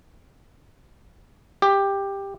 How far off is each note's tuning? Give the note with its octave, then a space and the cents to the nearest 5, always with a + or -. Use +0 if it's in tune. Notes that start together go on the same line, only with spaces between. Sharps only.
G4 +10